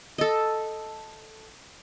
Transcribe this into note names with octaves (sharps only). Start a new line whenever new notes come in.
A4 D#5